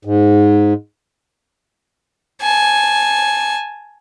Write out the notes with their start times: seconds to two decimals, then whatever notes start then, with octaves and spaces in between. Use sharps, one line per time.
0.05 G#2
2.42 G#5 A5